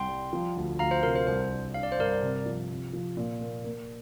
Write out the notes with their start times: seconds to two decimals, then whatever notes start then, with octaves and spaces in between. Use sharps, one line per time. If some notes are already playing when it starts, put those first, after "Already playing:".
Already playing: C2 G5 C6
0.08 G3
0.33 F3
0.56 D2
0.79 D2 F5 A#5
0.91 C5 F5
1.03 C3 A#4
1.15 C5
1.27 C2 C5
1.51 D4
1.74 D4 F5
1.83 D5
1.92 C5
1.98 G2 A#4 D5
2.22 C3
2.46 F3
2.70 C3
2.93 F3
3.17 A#2
3.41 A#3
3.64 A#3